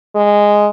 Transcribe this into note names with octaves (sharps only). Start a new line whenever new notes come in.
G#3